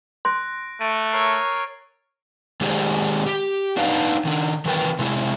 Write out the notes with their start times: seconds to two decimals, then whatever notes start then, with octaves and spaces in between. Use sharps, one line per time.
0.25 C6 F#6 A#6 D7
0.81 A3 A6 D7 D#7
1.13 A#4 C#5 E6 C7
2.61 D#3 G#3 G4 G#4 C5 D5
3.26 G4
3.77 B3 D4 D#4 B4 F5 G5
4.25 D#3 D4
4.65 D#3 E3 F#4 A#4 B4 G5
4.99 C3 G#3 E4